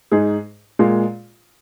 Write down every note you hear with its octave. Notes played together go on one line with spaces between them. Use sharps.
G#2 G#3 D#4 G#4
A#2 G#3 F4 G#4